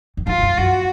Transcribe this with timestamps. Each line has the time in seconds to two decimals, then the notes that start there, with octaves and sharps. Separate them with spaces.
0.17 F2
0.27 F#2 F4
0.38 F2
0.42 F#2
0.57 F#2 F#4